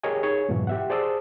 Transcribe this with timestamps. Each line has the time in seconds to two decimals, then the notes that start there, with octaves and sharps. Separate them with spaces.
0.03 G4 G#4 A#4 C#5 D#5 G#5
0.23 D#4 G#4 C#5
0.49 F2 G#2 B2 E3 F#3
0.67 G4 E5 F#5
0.90 G#4 C5 D5 A5 D#6 E6